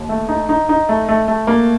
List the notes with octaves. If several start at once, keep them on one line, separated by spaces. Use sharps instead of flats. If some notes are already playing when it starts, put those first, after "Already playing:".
Already playing: D#2
A3
D#4
D#4
D#4
A3
A3
A3
A#3